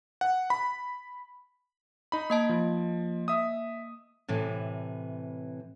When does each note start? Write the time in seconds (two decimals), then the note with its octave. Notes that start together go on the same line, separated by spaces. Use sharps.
0.21 F#5
0.50 B5
2.12 D#4 B5
2.30 A#3 D#5 A5
2.49 F3
3.28 E5 D#6
4.29 A2 C3 E3